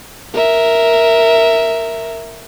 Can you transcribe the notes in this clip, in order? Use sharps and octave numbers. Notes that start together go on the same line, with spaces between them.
A#4 E5